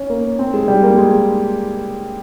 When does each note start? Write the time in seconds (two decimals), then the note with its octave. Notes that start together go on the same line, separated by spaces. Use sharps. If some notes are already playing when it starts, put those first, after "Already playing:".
Already playing: C#4
0.10 A#3
0.39 C4
0.54 G#3
0.68 G3
0.83 A#3
0.98 G#3